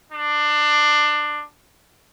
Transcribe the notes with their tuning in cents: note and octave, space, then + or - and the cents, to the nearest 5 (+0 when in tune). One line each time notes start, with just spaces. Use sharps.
D4 +20